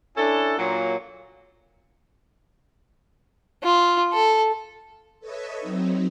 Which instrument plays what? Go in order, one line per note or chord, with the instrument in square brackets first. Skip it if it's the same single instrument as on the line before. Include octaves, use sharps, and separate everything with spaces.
[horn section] C#4 D4 E4 A4
A#2 F#3
[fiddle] F4
A4
[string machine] A4 B4 C#5 D#5 E5
F#3 C4 D#4